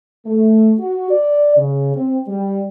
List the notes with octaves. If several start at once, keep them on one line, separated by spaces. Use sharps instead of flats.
A3
F#4
D5
C#3
C4
G3